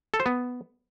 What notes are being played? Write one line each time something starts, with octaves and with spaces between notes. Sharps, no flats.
A4
C5
B3